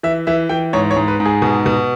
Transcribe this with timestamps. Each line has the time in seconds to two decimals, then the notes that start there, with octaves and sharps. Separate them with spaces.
0.03 E3 E5
0.27 E3 E5
0.49 E3 G5
0.73 G#2 C#5
0.91 C#5
0.96 G#2
1.08 B4
1.20 G#2
1.25 G#4
1.42 B2
1.66 B2